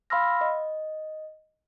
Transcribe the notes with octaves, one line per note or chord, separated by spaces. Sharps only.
F5 B5 C6 E6 F6 A#6
D#5